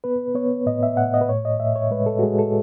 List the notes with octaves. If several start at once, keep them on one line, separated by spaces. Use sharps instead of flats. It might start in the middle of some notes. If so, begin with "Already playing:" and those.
B3 B4
B3 C#5
A2 D#5
E5
A2 F#5
D#5
B4
A2 C#5
D#5
A2 E5
C#5
G#3 B4
A4
F#4
G#3 G#4
A4